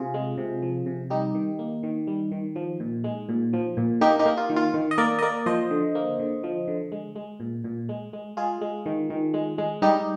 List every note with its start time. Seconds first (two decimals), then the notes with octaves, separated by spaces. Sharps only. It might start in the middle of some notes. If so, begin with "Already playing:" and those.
Already playing: C3 F4 G#4
0.14 G#3
0.38 C3
0.62 F3
0.86 C3
1.10 G3 D#4 G4
1.35 D#3
1.59 A#3
1.83 D#3
2.07 G3
2.32 D#3
2.56 F3
2.80 A#2
3.04 G#3
3.29 A#2
3.53 F3
3.77 A#2
4.01 A#3 D#4 G4
4.19 D#4 G4
4.26 A#3
4.37 F4
4.50 D#3
4.56 F4
4.74 D#3
4.91 D#5
4.98 A#3 A#4 D5
5.19 D#5
5.22 A#3 A#4 D5
5.46 F3 C5 D#5
5.71 D3
5.95 A#3
6.19 D3
6.44 F3
6.68 D3
6.92 G#3
7.15 G#3
7.40 A#2
7.64 A#2
7.89 G#3
8.13 G#3
8.37 G#3 F4 G#4
8.61 G#3
8.86 D#3
9.10 D#3
9.34 G#3
9.58 G#3
9.82 G3 D#4 G4